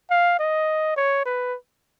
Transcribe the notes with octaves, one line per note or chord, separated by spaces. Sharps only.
F5
D#5
C#5
B4